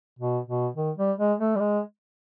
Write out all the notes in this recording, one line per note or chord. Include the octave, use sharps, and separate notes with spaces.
B2
B2
D#3
G3
G#3
A3
G3
G#3